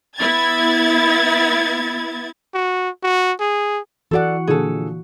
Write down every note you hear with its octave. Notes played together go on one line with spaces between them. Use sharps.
B3 E4 G#6 A6
F#4
F#4
G#4
E3 F#4 A4 D5 F#5
A#2 D3 F3 G#4 A4